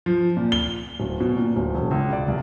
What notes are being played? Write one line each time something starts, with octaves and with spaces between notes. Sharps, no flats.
F3
A#2
G7
D1
B2
A#2
D1
E1
C#2
D5
C2